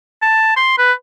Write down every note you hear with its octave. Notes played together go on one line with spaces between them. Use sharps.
A5
C6
B4